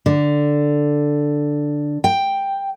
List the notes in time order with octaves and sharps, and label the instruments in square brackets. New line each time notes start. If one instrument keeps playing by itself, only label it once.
[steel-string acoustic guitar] D3
G5